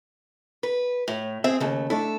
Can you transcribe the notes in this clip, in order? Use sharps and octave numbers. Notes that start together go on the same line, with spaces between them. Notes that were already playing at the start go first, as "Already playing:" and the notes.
B4
A2
C4 G#4 E5
D#2 C#3 A3
A3 D4 E4 A4